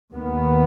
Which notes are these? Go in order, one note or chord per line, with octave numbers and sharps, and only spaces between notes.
D#2 D#3 B3